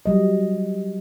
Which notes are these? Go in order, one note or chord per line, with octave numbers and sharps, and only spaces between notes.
F#3 G3 D#5